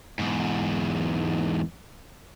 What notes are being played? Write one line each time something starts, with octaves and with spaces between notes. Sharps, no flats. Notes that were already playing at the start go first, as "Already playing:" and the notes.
E2 G#2